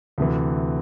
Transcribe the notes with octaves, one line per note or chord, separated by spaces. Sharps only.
D2 C3 E3